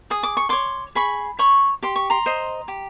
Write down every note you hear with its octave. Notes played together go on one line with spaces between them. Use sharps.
G#4 D#6
D6
C#6
C#5 C6 D6
G#4 B5 C#6
C#5 B5 C#6
G4 C6
C#6
A#5 C6
C5 D#5
G4